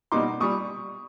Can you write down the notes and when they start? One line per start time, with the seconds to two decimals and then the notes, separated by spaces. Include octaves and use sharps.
0.12 B2 G3 A#3 D#4 C6 D6
0.40 A#2 G3 C#6 D#6